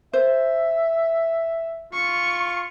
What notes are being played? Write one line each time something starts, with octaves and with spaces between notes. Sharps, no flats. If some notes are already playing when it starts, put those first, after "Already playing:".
C5 E5
F4 C#6